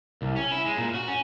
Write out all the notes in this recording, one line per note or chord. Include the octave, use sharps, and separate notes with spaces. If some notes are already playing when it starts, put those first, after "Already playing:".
C2
C#4
E4
G#3
A#2
F#4
C#4